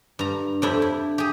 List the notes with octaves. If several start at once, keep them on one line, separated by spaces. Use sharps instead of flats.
G2 A#5
F2 D4 E4 G4
E4
G4 G#4